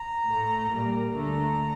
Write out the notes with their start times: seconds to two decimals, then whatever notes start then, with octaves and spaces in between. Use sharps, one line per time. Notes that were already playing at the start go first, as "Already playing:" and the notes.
Already playing: A#5
0.25 A2 A3
0.70 A#2 G3 A#3
1.16 D2 D3 A3 A#5